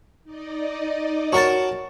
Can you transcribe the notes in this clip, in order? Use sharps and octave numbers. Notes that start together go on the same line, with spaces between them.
D#4 D5 D#5
F#4 A#4 C#5 A5 C#6